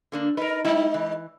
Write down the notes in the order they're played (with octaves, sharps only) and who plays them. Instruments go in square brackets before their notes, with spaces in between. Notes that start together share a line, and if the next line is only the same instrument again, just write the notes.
[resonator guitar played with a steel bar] D3 A#3 D4
[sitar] D#4 A#4 [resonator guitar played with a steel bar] B4
[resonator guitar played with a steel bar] G3 E4 [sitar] G#3 D#4
[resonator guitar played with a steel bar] E3